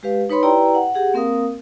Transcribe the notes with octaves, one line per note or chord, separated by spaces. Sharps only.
G#3 G4 B4 F5
D#4 B4 C#5 B5 C6
E4 G4 B4 D5 G5 A#5
F#5
G4 G#4 F#5
A#3 C4 A#4 F5 D#6